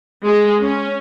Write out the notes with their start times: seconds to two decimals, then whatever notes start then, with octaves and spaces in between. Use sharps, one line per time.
0.25 G#3
0.62 C#4